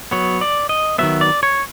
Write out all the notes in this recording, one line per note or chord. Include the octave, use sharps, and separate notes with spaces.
F#3 B3 C#5
D5
D#5
D#3 F#3 B3 E5
D5
C#5